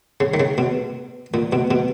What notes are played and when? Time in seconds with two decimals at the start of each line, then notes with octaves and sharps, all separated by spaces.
0.20 C#3
0.34 D#3
0.40 C#3
0.58 B2
1.34 A#2
1.53 B2
1.71 B2